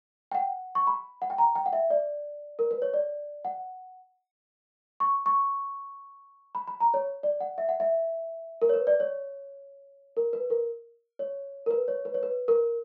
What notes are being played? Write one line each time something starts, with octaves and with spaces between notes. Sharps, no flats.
G5
F#5
C#6
B5
F#5
G5
A#5
G5
F#5
E5
D5
A#4
B4
C#5
D5
F#5
C#6
C#6
B5
B5
A#5
C#5
D5
F#5
E5
F#5
E5
A#4
C#5
B4
D5
C#5
A#4
B4
A#4
C#5
A#4
B4
C#5
B4
C#5
B4
A#4